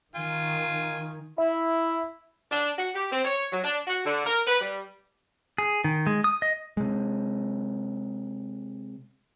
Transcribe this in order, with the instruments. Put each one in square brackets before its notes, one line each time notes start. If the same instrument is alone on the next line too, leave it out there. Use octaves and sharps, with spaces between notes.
[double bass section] D#3 [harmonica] F4 G#5
[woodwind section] E4 [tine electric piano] E5
[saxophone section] D4
F#4
G4
C4
C#5
F#3
D4
F#4
D3
A#4
B4
G3
[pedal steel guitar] G#4
D#3
G#3
D#6
D#5
[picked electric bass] C3 G#3